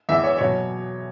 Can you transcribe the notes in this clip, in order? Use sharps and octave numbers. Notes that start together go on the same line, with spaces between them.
E2 E3 E5
C#5
B2 F#3 C#5